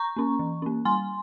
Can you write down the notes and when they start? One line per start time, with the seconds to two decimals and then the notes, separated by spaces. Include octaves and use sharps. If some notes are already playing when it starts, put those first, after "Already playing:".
Already playing: A#5 C#6
0.16 A#3 C#4
0.39 E3
0.62 A#3 C#4
0.85 G3 G#5 C6